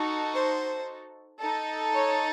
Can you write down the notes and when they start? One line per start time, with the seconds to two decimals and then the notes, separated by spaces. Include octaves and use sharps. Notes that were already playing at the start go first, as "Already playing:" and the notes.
Already playing: D#4 F#4 A4
0.32 C5
1.39 D#4 A4
1.93 C#5